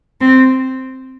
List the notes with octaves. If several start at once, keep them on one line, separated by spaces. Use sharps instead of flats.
C4